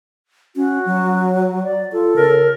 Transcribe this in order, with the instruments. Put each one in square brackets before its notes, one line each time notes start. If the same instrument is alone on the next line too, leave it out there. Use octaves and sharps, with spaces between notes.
[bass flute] C#4 [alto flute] F#4
[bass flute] F#3
[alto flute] D5
[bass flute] F4 [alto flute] A4
[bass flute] C#3 [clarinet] A#4